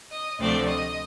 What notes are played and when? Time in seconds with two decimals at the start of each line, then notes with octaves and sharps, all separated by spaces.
0.11 D#5
0.39 D2 C3 F3 A3 C4 D5
0.69 D#5